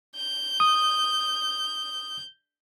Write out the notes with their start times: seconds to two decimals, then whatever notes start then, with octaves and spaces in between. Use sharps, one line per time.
0.17 G6
0.60 D#6